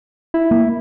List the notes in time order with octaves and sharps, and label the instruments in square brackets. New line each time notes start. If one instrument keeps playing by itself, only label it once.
[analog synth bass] E4
[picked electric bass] A#3